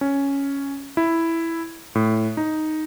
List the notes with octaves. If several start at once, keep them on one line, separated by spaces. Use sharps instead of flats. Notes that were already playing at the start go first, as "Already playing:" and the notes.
C#4
E4
A2
D#4